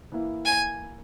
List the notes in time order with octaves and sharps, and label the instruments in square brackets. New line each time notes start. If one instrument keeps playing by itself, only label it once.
[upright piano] E3 A#3 E4
[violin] G#5